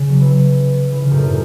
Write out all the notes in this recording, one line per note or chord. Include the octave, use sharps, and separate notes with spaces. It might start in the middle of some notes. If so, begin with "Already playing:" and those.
Already playing: C#3
F#3
E3
E3
C#3
F#2 A2
A2